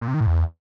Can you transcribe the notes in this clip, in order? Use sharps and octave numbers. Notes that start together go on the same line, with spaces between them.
A#2
C3
D#3
A2
E2